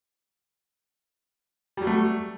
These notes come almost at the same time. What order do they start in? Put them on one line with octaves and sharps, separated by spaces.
G3 F#3 A3